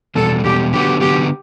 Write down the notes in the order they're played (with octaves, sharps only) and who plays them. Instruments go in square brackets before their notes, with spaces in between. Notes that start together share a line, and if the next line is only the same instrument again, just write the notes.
[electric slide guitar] E2 B2 G3 [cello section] A4
[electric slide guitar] E2 B2 G3 [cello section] G4
[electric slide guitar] D3 F#3 B3 F#4 [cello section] G4
[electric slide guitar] D3 F#3 B3 F#4 [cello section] G4